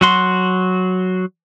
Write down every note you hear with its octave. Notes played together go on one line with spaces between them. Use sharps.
F#3 F#4 C6